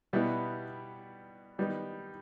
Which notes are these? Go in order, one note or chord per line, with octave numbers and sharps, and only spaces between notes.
B2 G3 B3 E4
D#3 G3 B3 D#4